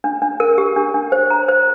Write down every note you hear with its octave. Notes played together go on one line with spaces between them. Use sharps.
D4
D4
A#4
G4
D4
D4
C5
A#5
C5